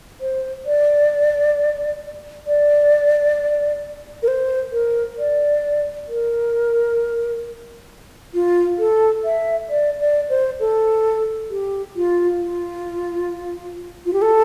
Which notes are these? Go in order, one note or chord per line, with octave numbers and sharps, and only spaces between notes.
C5
D5
D5
A#4
C5
A#4
D5
A#4
F4
A4
E5
D5
D5
C5
A4
G4
F4
F4
F4
G4
A4